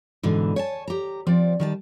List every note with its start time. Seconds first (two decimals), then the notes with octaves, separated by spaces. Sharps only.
0.23 G#2 B2 D3 E3
0.56 C#5 G#5 A5
0.88 G4 A#5
1.27 F3 C4 D5
1.60 D#3 G3 A5